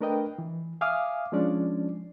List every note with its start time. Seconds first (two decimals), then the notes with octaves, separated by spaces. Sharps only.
0.01 A3 D4 A#4 B4 D#5 G5
0.38 E3
0.81 E5 F5 G#5 D6 D#6 F6
1.32 F3 G#3 C#4 D4 D5